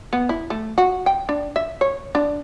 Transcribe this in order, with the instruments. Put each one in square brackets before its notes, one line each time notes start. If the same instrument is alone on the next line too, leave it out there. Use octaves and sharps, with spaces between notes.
[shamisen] B3
E4
A3
F#4
G5
D4
E5
C#5
D4